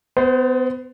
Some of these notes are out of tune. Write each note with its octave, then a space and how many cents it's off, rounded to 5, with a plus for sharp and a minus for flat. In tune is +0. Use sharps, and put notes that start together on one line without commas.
B3 +30 C5 -10